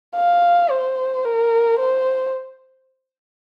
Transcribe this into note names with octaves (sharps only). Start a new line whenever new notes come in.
F5
C5
A#4
C5